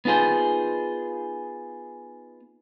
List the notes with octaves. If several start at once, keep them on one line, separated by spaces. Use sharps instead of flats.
B3 D#4 F4 G#4 C5